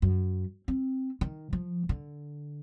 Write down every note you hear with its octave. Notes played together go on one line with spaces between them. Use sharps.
F#2
C4
D#3
F3
D3